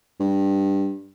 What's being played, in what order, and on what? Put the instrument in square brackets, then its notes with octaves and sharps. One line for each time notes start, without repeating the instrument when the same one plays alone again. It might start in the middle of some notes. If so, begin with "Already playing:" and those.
[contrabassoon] G2